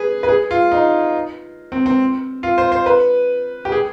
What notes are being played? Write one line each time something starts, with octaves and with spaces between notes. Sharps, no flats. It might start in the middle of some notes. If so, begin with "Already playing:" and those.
Already playing: G#4 B4
B4
G#4
F4
D#4
C4
C4
F4
C5
C5
B4
G4
G#4